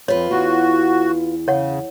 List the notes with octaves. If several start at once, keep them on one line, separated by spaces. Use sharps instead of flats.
F2 F4 B4 C#5
E2 F#4
C#3 C#5 F#5